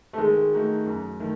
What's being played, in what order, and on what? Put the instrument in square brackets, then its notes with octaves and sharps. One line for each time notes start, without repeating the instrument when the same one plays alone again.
[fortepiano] A3
[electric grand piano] D#3 [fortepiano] G#3
[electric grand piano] A3 D#4 F#4
F#2
D#3 A3